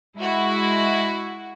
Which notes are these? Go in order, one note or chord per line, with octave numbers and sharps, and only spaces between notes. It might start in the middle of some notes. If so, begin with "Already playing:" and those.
G#3 E4 F#4